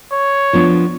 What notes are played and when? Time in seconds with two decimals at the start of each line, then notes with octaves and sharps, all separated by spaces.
0.12 C#5
0.53 F3 B3 D4